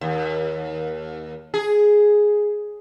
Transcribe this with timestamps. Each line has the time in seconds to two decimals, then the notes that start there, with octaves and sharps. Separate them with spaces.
0.01 D#2
1.54 G#4